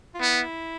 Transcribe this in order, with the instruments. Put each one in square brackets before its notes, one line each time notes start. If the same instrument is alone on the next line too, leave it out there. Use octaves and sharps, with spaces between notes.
[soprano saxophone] F4
[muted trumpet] B3 [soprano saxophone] E4